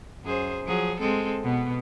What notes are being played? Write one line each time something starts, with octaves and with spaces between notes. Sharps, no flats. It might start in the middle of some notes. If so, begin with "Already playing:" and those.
F#2 G#4 C5
F3 F#3 G#4
G#3 C4 A4
B2 B3